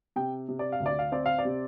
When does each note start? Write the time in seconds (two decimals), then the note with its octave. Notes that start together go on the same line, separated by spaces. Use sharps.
0.16 C3 G5
0.49 C3
0.59 D5
0.72 F5
0.80 D2
0.86 D5
0.99 F5
1.12 C4 D5
1.26 F5
1.38 D5
1.45 C3